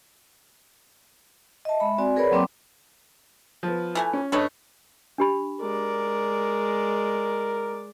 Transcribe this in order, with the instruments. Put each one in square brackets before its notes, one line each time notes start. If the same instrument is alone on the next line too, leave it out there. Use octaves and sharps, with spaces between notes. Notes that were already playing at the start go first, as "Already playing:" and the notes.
[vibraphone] D#5 E5 A5
G#3 E5 B5
C4 F#4 D5 G#5
G#4 A#4 B4 C#5 D5 B5
F#3 A#3 C4 G5 C6 D6
[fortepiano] F3 B3
[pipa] E3 A3 G#5
[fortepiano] C#4
[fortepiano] G2 C#5 D#5 [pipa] A3 A4 B4
[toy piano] D4 G4 B5
[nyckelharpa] G#3 D5 [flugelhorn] A#4